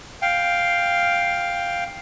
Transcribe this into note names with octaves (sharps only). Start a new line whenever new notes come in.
F5 G5